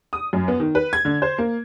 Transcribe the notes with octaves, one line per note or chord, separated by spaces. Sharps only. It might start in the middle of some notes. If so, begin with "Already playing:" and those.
D#6
F#2
B3
D#3
B4
G#6
D3
C5
A#3